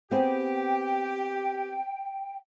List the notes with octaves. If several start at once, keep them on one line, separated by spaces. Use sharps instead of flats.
B3 C4 G4 G#4 G5